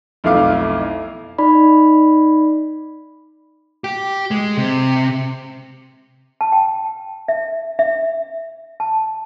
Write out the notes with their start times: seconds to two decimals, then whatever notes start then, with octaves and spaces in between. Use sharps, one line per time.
0.24 B1 F2 A3 E4 F5 D6
1.38 D#4 D5 B5
3.84 G4
4.31 G#3
4.57 C3
6.41 A5
6.52 G5
7.28 E5
7.79 E5
8.80 A5